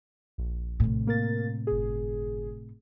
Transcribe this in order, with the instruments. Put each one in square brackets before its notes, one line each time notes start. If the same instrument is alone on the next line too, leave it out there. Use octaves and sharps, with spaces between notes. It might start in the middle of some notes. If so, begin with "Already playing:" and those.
[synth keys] A#1
[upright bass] A2 C3
[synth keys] A#3 A#4 A6
G1 G#4